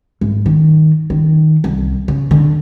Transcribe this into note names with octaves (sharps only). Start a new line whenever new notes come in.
G#1
D#3
D#3
C2
C#3
D3